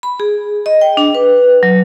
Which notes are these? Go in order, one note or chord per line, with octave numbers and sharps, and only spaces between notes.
B5
G#4
D#5
G5
D4
B4
F#3